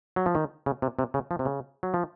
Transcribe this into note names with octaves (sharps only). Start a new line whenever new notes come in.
F#3
F3
D#3
C#3
C3
C3
C#3
F3
C3
C#3
F#3
F3